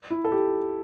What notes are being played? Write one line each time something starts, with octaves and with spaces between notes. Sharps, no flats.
E4
A4
G4